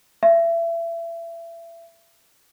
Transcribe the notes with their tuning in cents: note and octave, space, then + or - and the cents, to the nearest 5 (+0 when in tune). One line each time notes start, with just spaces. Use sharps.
E5 +30